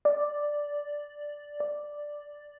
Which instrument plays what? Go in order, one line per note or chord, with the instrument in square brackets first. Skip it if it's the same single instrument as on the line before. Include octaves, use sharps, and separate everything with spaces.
[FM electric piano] D5
D5